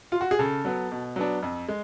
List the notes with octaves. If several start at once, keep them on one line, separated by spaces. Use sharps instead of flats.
F4
F#4
G#4
C#3 A4
F#3 B3
B2
F#3 B3 D4
F2
G#3